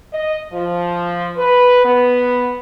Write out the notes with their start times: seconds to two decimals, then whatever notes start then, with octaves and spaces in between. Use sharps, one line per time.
0.13 D#5
0.51 F3
1.37 B4
1.84 B3